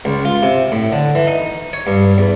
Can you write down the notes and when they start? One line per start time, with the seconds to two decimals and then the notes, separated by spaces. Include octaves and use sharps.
0.05 C#2
0.25 F4
0.43 C3
0.72 A2
0.92 D3
1.15 E3
1.27 D#4
1.73 C#5
1.87 G2
2.18 E2